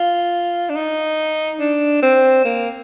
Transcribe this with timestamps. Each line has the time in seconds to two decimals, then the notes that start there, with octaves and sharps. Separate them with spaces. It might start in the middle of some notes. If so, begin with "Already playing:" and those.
Already playing: F4
0.69 D4
0.76 D#4
1.60 D4
2.02 C4
2.44 A#3